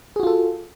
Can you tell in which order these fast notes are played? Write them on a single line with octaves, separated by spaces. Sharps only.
G#4 F#4 F4 A4